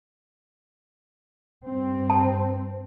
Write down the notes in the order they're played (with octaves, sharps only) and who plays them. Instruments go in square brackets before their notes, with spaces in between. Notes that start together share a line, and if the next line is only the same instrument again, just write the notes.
[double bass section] G2 C4
[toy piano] A5